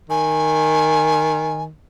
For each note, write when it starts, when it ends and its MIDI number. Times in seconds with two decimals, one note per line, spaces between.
0.10 1.70 51
0.10 1.63 80